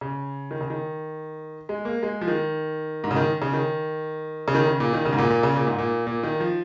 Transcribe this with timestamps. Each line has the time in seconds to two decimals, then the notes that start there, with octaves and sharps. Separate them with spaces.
0.01 C#3
0.51 D#3
0.61 C#3
0.70 D#3
1.69 G#3
1.85 A#3
2.03 G#3
2.21 F3
2.28 D#3
3.04 G#2
3.11 C#3
3.16 D#3
3.42 C#3
3.53 D#3
4.48 C#3
4.55 D#3
4.67 C#3
4.80 A#2
4.93 D#3
5.05 C#3
5.13 G#2
5.18 A#2
5.30 A#2
5.43 C#3
5.56 A#2
5.67 G#2
5.79 A#2
6.07 A#2
6.23 D#3
6.40 F3